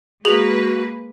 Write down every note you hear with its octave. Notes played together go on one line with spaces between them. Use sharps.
G#3 A#3 F#4 G#4 B4 F7 F#7